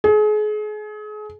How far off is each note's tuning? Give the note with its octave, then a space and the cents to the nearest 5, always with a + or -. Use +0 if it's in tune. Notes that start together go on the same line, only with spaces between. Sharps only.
G#4 +35